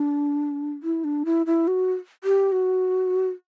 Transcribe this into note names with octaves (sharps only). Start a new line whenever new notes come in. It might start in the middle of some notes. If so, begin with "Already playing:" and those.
Already playing: D4
E4
D4
E4
E4
F#4
G4
F#4